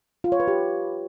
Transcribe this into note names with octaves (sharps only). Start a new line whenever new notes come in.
F4
C#5
B4
G4